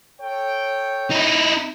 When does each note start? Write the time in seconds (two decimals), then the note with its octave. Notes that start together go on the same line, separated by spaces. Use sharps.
0.21 A4 C#5 G5
1.10 D#4 E4